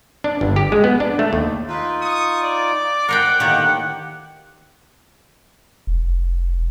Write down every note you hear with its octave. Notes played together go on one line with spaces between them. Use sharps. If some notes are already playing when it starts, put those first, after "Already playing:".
D4
G1
G4
G#3
B3
D4
A3
D#2
C4 D#4 F4 B4
C#6 D#6
D5 D6
A#4 C5 F#5 G5
A2 D3 D#3 A#3 G4
F1